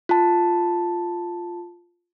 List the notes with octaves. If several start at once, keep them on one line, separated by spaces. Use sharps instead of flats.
F4 A5